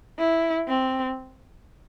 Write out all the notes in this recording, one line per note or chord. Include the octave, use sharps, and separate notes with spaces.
E4
C4